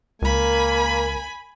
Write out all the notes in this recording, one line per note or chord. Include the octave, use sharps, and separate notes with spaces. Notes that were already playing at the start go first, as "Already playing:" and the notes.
C#2 A#3 A#4 G#5 B5